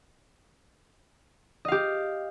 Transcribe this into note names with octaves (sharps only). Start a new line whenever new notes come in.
G4 D#5 F5